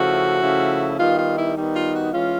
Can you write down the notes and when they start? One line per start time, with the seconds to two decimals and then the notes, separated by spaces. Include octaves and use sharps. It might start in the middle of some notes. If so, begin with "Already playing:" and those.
Already playing: C#3 F3 A3 C#4 E4 F#4
0.42 C#3 F3 A3 C#4 E4
0.99 D#3 G3 B3 D#4 F4
1.18 F4
1.37 E4
1.56 D#3 G3 B3 D#4
1.74 F4
1.94 F#4
2.13 E3 G#3 C#4 F4